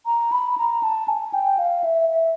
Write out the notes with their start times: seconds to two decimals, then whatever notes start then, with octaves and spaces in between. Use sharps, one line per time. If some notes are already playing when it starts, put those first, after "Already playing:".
0.06 A#5
0.32 B5
0.58 A#5
0.83 A5
1.08 G#5
1.34 G5
1.59 F5
1.84 E5
2.10 E5